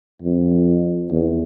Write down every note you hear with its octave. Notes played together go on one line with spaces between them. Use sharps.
F2
E2